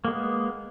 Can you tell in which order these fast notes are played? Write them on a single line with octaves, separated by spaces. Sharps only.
A#3 G#3 B3